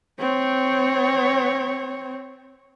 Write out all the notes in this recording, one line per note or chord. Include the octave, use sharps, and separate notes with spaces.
C4 C#5